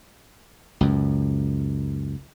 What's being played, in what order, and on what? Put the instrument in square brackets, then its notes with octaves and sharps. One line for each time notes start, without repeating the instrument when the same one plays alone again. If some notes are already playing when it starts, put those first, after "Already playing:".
[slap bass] C#2 F#2